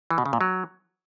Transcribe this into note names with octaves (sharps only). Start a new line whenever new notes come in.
E3
B2
C#3
A#2
F#3